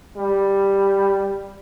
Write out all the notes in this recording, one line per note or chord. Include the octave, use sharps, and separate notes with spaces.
G3